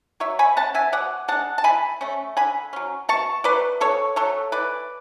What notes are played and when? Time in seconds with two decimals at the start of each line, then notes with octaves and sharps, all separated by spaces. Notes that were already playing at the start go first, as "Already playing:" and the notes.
0.20 F#3 C#5 E5
0.39 G#5 B5
0.57 C#4 F#5 A5
0.75 E5 G#5
0.92 B2 D5 F#5
1.28 G#3 D4 F#5 A5
1.58 A5
1.64 E3 G#5 B5
2.01 A3 C#4
2.37 D3 G#5 B5
2.73 F#3 C#4
3.09 B2 A5 C#6
3.44 F#3 A3 B4 D5
3.80 B2 A4 C#5
4.16 F#3 A3 A4 C#5
4.52 E3 B4 D5